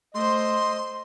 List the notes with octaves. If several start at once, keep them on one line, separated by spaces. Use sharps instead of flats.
A3 C5 D#5 C6